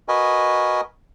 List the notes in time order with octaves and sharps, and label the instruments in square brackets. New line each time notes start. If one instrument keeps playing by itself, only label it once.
[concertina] F#4 A#4 B4 D#5 G#5